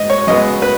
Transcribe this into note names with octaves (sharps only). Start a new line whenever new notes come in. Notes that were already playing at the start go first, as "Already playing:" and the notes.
Already playing: G#2 D#5
C#5
F#2 C#3 G#3 B3 D#5
B4